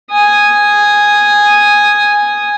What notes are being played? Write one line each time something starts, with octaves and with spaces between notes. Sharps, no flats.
G#5 D#6